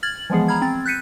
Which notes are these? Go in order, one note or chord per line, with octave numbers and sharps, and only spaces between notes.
F6 G#6 A6 F#7
E3 F3 G#3 B3 G#4
A#5 B5 F6 G#6
C4 A6
F#6 G6 B6 C#7 D#7